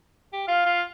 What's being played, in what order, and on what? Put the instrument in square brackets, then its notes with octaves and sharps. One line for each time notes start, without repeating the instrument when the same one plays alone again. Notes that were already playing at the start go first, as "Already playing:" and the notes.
[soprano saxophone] G4
[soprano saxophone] F4 [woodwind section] F5
[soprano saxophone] F4